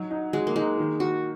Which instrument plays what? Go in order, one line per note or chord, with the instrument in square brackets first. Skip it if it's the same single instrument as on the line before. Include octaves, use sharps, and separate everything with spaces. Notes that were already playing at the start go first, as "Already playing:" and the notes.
Already playing: [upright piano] F#3 D#4
D#4
[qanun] G#3 [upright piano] F#4
[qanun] A#3
[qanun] G#3 [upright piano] D#4
[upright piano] D#3
[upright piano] D#3 [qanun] F#4